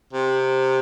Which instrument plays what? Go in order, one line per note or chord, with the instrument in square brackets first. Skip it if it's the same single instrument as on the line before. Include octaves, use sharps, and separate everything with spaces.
[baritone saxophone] C3